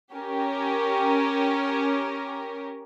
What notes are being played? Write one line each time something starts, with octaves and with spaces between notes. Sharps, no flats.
C#4 G4 A#4